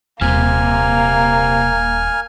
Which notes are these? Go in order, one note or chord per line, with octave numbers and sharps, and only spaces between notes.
D#1 C3 A#3 G#5 F6